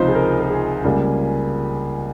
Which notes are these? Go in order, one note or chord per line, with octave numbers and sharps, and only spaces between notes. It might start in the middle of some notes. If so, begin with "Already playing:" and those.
Already playing: C#2 C3 F3 D#4 F4 C5
G#4
A#4
A#4
G#4
C#2 C#3 G3 A#3